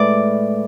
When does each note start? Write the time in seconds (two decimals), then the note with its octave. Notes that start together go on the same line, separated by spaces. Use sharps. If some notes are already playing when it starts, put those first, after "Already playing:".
Already playing: A2 G#3 B4 D5